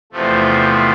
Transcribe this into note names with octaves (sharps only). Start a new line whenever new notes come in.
E2 C3 F3 A3